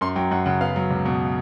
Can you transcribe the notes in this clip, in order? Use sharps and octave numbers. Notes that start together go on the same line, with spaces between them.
F#2 C6
F#3 G5
F#2 F#5
C#3 F#5
B3 F5
F#3
C#2
B2